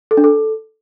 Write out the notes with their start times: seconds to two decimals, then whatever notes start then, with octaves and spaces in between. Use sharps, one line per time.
0.11 A4
0.17 D4
0.24 A4